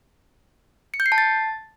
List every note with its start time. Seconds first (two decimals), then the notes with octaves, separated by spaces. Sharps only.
0.94 C#7
1.00 G6
1.06 C7
1.12 A5
1.18 A6